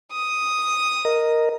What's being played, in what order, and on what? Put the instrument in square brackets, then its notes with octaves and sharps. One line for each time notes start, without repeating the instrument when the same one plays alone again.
[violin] D#6
[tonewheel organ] A#4 D#5